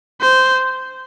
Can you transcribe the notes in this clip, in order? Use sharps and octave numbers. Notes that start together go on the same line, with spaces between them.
C5